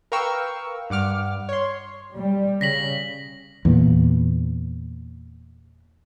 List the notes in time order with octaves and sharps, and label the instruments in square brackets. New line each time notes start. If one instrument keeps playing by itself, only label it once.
[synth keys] A#4 B4 F5 G5 C#6 E6
G2 F#5 D6 F6
C#5 C6
[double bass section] G3
[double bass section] C#3 [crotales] A#6 B6 F#7
[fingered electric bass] E2 A#2